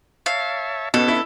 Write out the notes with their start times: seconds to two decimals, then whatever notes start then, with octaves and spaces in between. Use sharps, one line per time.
0.26 C#5 E5 F5 A5
0.94 B2 B3 C#4 A4
1.08 E4